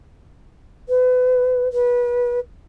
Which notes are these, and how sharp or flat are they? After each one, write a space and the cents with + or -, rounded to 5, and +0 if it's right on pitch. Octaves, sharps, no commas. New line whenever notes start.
B4 +30
B4 -25